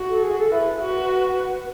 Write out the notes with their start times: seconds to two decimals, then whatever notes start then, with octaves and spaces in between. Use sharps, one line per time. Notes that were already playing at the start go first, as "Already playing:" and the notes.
Already playing: F#4
0.09 A4
0.22 G#4
0.38 A4
0.51 E4 B4
0.80 F#4